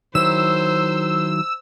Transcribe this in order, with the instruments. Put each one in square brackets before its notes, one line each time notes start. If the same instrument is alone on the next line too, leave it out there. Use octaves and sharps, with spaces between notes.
[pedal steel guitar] D#3 F#3 E4 [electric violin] C5 [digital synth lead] E6